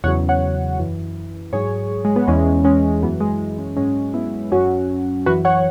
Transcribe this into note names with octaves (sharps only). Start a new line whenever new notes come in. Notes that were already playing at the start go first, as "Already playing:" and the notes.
E2 C#3 F#3 C#5 F#5
C#5 F#5
F#2 E3
G#2 F#3 G#4 C#5
G#3
B3
E2 E3 G#3 C#4
G#3 C#4
F#2 E3 B3
G#3
G#3 C#4
G#2 F#3 G#3 C#4
B3 E4
F#2 F#3 C#4 F#4
F#2 E3 F#4 B4
C#5 F#5